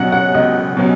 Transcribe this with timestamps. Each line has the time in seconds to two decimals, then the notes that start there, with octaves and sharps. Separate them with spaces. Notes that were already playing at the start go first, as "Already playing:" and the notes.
Already playing: C#2 B2 F#3 C#4 F#5
0.12 F#5
0.34 C#2 D#5
0.77 B2 F#3 C#4